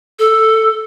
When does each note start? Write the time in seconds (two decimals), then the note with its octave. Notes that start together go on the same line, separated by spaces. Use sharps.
0.19 A4